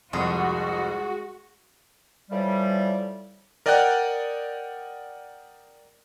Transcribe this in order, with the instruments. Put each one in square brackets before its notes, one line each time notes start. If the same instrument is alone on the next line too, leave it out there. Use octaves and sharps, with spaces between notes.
[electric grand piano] C2 F2 D#6 [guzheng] G#3 [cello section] F#4
[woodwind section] A2 E3 F3 G3
[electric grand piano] A#4 D5 D#5 F#5 G5 F#6